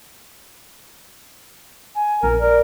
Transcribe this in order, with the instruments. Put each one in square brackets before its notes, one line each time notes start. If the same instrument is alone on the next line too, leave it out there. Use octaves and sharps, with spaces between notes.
[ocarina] G#5
[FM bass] A#1 [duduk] A#4
[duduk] A#4 [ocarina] D5